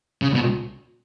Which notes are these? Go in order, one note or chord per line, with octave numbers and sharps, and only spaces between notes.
C#3
B2